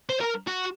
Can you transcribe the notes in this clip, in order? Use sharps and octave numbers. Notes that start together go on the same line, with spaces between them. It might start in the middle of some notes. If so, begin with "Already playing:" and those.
C5
A#4
F#4